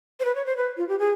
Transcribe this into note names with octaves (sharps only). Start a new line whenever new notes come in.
C5
B4
C#5
C5
B4
F4
G4
G#4